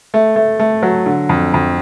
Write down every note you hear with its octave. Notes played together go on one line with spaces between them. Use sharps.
A3
A3
A3
F#3
D3
F2
F2